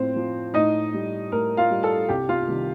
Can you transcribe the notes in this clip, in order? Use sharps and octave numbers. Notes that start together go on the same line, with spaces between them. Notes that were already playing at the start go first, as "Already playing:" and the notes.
Already playing: A2 F3 C4 C5
F3
A2 D#4 D#5
G3
A2 A#4
F4 F5
G3
A4 A5
C2 G4 G5
F4 F5
C3 D#3 G3